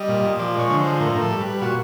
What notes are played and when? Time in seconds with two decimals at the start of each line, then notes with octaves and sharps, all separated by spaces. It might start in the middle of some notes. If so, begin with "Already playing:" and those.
Already playing: G3 D#5
0.08 A#2
0.24 A#2
0.39 F3 D5
0.54 G#3 C#5
0.70 D3
0.80 F3 C5
1.00 A2 A#4
1.12 A2 A#4
1.21 A4
1.31 G3
1.41 B4
1.46 G3
1.61 A#2 F#4